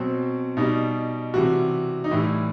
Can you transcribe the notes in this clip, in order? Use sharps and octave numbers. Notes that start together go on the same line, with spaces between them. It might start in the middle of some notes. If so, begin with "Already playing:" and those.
Already playing: B2 F#3 C4
B2 G3 D#4
C3 E3 G3 F#4
D#4
A2 E3 G3 E4